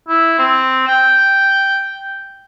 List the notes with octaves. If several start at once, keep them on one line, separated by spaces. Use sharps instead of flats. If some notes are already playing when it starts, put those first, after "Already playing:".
E4
C4
G5